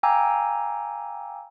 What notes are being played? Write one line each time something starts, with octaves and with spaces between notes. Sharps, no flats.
F5 G5 G#5 A#5 D6 E6